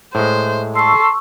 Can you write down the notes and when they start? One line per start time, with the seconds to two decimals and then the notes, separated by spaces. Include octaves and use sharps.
0.15 A2 G#3 C5
0.76 A4 C6 C#6 E6